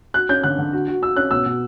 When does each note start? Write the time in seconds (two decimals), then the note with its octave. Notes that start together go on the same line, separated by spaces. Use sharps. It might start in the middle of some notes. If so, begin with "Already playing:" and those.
0.14 F#4 F#6
0.29 C#4 G6
0.43 D3 F#6
0.58 D3
0.73 F#4
0.88 F#4
1.02 F#4 E6
1.16 C#4 F#6
1.31 B2 E6
1.46 B2